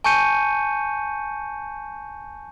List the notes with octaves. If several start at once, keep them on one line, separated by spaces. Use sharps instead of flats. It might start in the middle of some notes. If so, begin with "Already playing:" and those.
G#5 A5 C#6 G6 C#7 D#7